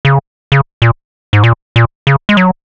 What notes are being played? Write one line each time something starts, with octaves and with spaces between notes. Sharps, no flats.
C#3
C#3
A#2
G#2
A#2
A#2
C#3
G#3
F#3